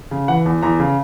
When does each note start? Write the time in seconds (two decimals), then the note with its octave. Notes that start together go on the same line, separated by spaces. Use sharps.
0.11 C#3
0.28 E3 F#5
0.46 E2
0.62 E2 A#5
0.80 C#3